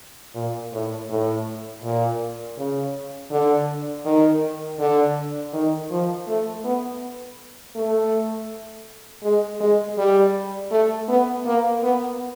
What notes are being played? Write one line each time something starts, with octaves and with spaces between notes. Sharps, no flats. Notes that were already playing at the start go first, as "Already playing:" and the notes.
A#2
A2
A2
A#2
C#3
D3
D#3
D3
D#3
F3
A3
B3
A3
G#3
G#3
G3
A3
B3
A#3
B3